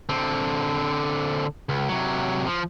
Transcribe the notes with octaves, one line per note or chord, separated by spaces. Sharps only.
D3 C4
C#2
C3 F#3
F3